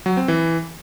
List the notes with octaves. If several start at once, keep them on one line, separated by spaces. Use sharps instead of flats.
F#3
C4
E3